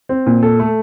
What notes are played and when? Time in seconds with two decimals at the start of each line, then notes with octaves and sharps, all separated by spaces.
0.09 C4
0.26 A#2
0.43 A4
0.60 A3